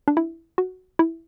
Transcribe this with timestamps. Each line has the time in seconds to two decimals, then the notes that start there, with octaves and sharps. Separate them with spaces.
0.08 D4
0.17 E4
0.58 F#4
0.99 E4